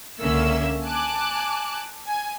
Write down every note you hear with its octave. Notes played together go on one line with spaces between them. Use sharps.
C#2 D3 A#3 C#4 E5 E6
G#5 A5 D6 F#6
G#5